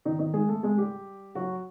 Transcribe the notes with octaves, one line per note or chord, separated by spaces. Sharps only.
D#3 D#4
D#3 D#4
G#3 G#4
A3 A4
G#3 G#4
G3 G4
F#3 F#4